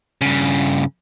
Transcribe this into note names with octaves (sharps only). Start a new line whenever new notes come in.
G2 C#3